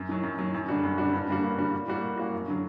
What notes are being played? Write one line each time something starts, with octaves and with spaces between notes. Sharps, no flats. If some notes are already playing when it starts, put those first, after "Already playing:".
Already playing: F#2
D#3 F#3
F#2
D#3 F#3
F#2
D3 G3 D4 F#4
F#2
D3 G3 D4 F#4
G2
D3 G3 A#3 F#4
G2
D3 G3 A#3 F#4
A2
G3 A#3 F#4
A2
G3 A#3 F#4
F#2
D3 F#3